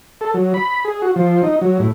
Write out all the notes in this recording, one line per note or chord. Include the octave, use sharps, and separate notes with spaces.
A4
F#3
B5
G#4
F#4
F3
D#4
F#3
A2